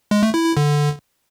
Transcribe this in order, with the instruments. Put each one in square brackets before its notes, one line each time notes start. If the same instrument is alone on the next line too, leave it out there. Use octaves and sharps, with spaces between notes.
[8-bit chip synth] G#3
A3
E4
E4
D3